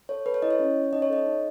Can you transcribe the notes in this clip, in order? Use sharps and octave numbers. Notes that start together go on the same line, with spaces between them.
A4 C#5
A4 B4
C#5
E4 D#5
C#5
C#4
C#4
D#4 D#5
C#5
A4 D#5
D#4